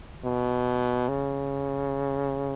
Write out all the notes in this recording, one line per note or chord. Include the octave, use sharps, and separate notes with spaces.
B2
C#3